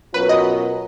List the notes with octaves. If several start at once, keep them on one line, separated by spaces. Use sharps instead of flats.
B2 F#3 C#4 F4 A#4 B4
D#5